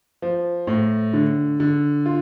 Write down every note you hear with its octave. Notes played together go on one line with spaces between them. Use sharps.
F3
A2
D3
D3
F4